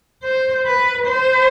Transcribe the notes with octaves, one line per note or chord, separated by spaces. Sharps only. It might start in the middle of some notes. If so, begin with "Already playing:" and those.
C5
B4
C5